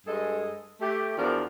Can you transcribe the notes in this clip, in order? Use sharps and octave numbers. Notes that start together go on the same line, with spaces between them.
G2 G#3 G#4 A4 D#5
A3 G4
E2 F3 D4 F#4 A#4